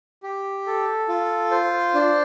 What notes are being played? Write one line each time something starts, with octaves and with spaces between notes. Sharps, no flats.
G4
A4
F4
C5
D4